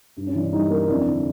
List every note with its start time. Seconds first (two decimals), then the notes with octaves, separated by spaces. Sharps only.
0.17 G2
0.27 C#4
0.34 E3 D4
0.53 G3 C#4 D#4
0.70 A#3
0.88 F2 D4 E4
1.07 D3